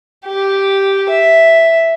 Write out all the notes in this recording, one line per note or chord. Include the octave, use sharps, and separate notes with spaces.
G4
E5